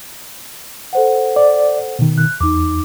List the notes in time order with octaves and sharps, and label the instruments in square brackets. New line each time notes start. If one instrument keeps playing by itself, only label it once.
[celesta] A4 C5 F#5
[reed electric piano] D5
B2 D#3
[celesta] F#6
[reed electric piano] E2 [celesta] D#4 D6